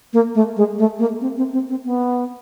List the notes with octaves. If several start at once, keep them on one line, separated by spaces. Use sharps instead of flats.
A#3
A3
G#3
A3
A#3
C4
C4
C4
C4
B3